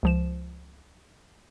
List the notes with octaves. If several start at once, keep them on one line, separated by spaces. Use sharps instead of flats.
C#2 F3 E7